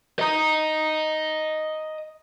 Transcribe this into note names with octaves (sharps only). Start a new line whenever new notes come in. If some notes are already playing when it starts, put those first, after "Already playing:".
D#5 A#5